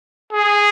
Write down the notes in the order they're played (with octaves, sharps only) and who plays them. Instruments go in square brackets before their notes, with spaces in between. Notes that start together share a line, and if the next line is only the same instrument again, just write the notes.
[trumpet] G#4